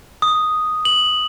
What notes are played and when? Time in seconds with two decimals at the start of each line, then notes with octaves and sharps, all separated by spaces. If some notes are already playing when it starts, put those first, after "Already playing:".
0.22 D#6
0.85 F#7